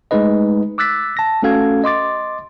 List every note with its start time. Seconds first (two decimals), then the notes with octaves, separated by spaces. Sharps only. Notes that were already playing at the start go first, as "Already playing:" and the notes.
0.11 G#3 A3 D#4 B4 D#5
0.78 D6 E6 F#6 A6 B6
1.17 A5 A#6
1.43 A3 C#4 F#4 A4 F5 G#6
1.84 D#5 C6 D6 A6